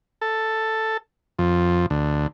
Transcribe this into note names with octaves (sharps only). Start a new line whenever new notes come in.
A4
F2
D2